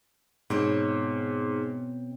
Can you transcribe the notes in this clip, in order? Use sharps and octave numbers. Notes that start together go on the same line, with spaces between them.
G#2 B2 C4 C#5